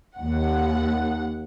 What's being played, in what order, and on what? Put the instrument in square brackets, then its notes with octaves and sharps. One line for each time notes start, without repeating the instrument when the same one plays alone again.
[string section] D#2 F#5